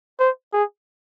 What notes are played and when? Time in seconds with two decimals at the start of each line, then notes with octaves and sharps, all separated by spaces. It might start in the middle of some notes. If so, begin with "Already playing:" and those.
0.19 C5
0.53 G#4